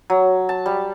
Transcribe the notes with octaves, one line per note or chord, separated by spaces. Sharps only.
F#3
A5
G3